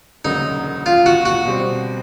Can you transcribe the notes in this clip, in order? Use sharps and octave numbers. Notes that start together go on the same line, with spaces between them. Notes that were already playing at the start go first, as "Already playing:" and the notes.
E1 D2 C#3 F#3 A#3 D#4
F4
F#4
F#4
B2 G3 C4